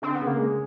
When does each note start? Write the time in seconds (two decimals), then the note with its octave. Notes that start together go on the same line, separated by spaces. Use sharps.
0.02 D3 C4
0.15 B3
0.21 C#3
0.27 A#3
0.39 G#3